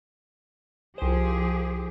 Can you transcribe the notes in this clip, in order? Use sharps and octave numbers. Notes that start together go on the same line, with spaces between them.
C2 F3 G4 G#4 C5